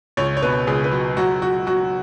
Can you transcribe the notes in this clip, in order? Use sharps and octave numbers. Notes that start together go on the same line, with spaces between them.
C#2 C#5
C#5
B2 B4
C#2 G#4
B4
F#3
F#3 F#4
F#3 F#4
F#3 F#4